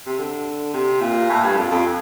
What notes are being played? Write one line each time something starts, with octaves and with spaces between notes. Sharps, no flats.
C3
D3
C3
A#2
A2
G2
F2
F2